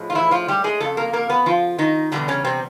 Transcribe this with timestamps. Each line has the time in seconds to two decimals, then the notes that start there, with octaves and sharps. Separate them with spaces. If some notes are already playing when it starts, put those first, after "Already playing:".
Already playing: A2 F3 G#3
0.10 F4
0.15 E3 E4
0.31 F3 F4
0.48 G3 G4
0.64 G#3 G#4
0.80 F2 C#3 A4
0.97 A#3 A#4
1.13 A#3 A#4
1.29 B3 B4
1.46 F3 F4
1.79 D#3 D#4
2.12 E2 B2 D3 G3 D4
2.28 C#3 C#4
2.44 C3 C4